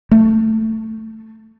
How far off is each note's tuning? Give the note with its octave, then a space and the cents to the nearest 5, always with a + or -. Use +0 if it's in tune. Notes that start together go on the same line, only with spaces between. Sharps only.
A3 +10